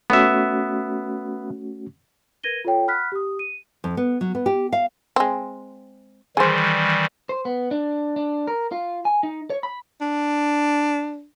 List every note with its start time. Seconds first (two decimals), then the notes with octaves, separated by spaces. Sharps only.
0.10 A3 B3 C#4 F#4 E5
2.43 A#4 B4 G#6 A#6 D#7 G7
2.65 F4 A4 C#5 G5
2.87 F#5 B5 F6 F#6 B6
3.12 G4 D#6
3.39 D#7
3.84 F2
3.97 B3
4.21 F#3
4.35 B3
4.46 G4
4.73 F5
5.16 G#3 C4
6.37 D#3 E3 G3 G#4 C5
7.29 C5
7.45 B3
7.71 D4
8.16 D4
8.47 A#4
8.72 F4
9.05 G#5
9.23 D#4
9.50 C#5
9.63 B5
10.01 D4